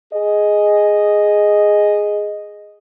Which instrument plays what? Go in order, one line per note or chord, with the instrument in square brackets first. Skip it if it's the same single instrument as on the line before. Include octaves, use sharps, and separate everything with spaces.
[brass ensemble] G#4 D#5